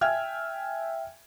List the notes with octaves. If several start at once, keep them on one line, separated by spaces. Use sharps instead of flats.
E5 G5 G#5 F6 G#6